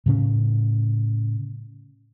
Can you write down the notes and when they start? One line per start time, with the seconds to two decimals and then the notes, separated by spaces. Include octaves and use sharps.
0.06 A2 C#3 C#4